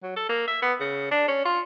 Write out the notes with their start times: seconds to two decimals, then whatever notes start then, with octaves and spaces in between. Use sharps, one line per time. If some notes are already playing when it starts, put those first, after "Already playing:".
0.03 F#3
0.16 A4
0.29 A#3
0.48 E5
0.62 B3
0.80 C#3
1.11 D4
1.28 C#4
1.45 F4